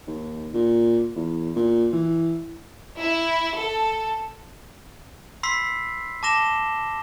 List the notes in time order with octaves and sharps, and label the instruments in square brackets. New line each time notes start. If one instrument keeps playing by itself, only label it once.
[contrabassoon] D#2
A#2
E2
A#2
E3
[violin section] E4
A4
[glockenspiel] B5 C6 E6 B6 C7
A5 D6 A#6 E7 G7